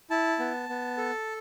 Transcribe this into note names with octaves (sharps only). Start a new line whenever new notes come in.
E4 A5
B3
B3
A4